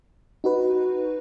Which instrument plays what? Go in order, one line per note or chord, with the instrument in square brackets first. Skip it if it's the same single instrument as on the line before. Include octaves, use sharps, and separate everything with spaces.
[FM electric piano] D#4 F#4 B4